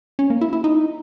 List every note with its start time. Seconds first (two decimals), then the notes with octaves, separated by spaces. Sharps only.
0.19 C#4
0.30 A#3
0.41 E4
0.53 E4
0.64 D#4